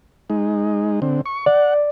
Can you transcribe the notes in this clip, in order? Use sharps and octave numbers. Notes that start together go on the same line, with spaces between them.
G#3 D#4
D3 C4
C#6
D5 F#5